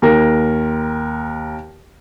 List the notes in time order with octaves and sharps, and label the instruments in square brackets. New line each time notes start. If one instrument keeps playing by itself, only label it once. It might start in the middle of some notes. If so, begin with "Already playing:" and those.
[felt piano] D#2 A#4